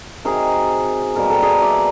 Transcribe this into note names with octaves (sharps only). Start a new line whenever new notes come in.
C3 D#3 F#3 G#4 A#4
B2 G3 A#3 A#4
A4
G#4 A#4
D5 E5